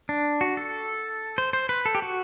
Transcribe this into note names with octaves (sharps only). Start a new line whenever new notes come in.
D4
F#4
A4
C5
C5
B4
A4
G4
F#4